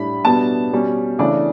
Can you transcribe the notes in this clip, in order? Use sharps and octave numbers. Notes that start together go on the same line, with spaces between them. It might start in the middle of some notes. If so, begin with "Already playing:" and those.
Already playing: A2 G3 D4 B5
B2 G3 B3 D4 A5
B2 G3 C#4
C#3 E3 A3 D4 D5